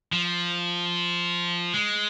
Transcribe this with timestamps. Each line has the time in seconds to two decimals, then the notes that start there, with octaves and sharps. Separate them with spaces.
0.12 F3
1.74 G#3